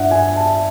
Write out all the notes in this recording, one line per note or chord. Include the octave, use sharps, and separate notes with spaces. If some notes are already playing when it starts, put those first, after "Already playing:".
Already playing: G2 E5 F#5
G#5
A5